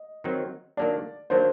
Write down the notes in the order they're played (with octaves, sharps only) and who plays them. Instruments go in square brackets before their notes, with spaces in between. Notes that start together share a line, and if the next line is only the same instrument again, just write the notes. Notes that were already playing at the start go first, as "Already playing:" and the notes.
Already playing: [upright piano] D#5
[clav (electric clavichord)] D#3 F#3 C4 D#4
[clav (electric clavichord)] D#3 F#3 A#3 D4 [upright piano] D5
[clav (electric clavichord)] D#3 F#3 A#3 D4 [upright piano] C5